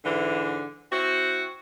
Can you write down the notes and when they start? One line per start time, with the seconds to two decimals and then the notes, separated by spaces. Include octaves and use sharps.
0.05 G#2 D3 E3
0.92 C4 E4 F#4